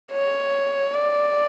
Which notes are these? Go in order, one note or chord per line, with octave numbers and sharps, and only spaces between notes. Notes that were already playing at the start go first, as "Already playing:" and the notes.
C#5
D5